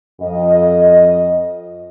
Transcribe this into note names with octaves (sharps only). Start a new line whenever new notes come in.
F2 D#5